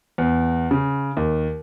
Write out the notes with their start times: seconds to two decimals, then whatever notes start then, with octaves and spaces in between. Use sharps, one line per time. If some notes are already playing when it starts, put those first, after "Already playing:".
0.18 E2
0.71 C#3
1.17 D#2